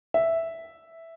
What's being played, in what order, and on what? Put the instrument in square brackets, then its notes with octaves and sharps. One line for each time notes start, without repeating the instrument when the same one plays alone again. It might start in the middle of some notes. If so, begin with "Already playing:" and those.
[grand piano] E5